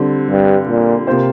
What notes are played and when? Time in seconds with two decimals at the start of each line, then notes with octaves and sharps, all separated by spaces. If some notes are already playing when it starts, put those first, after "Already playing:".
Already playing: D3 G3 C4
0.30 G2
0.68 A#2
1.07 C3 A#3 F4 C5